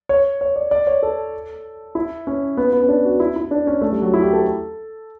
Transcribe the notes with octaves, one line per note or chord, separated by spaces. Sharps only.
C#5
C#5
D5
D5
C#5
A4
E4
C#4
B3
B3
C#4
D4
F#4
E4
E4
D4
C#4
A3
G3
F#3
E4
G4
A4